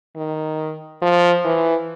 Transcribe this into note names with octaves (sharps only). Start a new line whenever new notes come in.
D#3
F3
E3